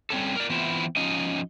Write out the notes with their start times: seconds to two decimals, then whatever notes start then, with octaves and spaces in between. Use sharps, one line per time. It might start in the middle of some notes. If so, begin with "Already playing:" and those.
0.10 G3 C4 C#4 A4
0.36 A#4 D5
0.50 E3 B3 C4 E4 F4
0.96 F3 C#4 D#4 D#5